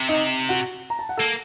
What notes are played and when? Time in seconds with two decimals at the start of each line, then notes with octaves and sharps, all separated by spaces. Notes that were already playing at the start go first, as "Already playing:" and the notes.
Already playing: C3
0.09 D#4 D#5
0.49 F#4 F#5
0.90 A#5
0.99 A5
1.09 F#5
1.17 A#3 A4 A5